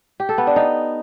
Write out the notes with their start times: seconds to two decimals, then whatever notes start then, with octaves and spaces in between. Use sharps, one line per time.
0.20 G4
0.29 A4
0.38 B3
0.47 D4
0.56 D#4